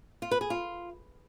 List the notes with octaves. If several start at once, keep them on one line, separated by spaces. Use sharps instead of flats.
F4
B4
G#4
F4